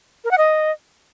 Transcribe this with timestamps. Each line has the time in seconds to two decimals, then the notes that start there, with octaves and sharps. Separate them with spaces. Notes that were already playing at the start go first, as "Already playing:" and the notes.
0.24 A#4
0.31 F#5
0.38 D#5